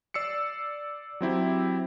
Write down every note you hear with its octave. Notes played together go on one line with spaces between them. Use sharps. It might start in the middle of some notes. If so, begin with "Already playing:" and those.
D5 E6 C7 C#7
F#3 C4 E4 G4